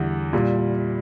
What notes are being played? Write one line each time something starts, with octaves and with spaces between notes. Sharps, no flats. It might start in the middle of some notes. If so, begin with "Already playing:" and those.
Already playing: E2 D3 G3 E4
A#2 G3